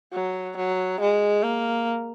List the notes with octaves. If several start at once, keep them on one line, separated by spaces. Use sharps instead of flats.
F#3
F#3
G#3
A#3